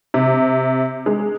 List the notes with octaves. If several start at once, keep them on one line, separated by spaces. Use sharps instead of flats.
C3
G#3